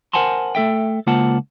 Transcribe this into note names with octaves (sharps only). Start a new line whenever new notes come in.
A#4 C5 F#5 G#5 A5 C6
A3 A4 E5 G5
C#2 A#3 F4 C5 F#5 A5